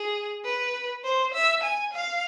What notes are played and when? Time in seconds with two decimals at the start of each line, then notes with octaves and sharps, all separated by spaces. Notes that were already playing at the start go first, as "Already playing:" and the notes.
Already playing: G#4
0.44 B4
1.04 C5
1.34 E5
1.63 G#5
1.93 F5